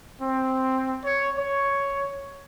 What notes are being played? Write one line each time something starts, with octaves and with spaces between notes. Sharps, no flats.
C4
C#5
C#5